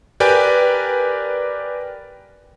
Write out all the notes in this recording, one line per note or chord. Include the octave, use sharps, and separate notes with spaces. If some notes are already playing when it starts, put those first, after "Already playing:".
G4 A#4 B4 D5 G5 G#5